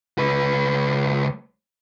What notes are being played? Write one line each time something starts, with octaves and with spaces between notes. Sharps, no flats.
C#2 B4